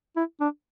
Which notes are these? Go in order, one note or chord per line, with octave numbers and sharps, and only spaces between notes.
E4
D4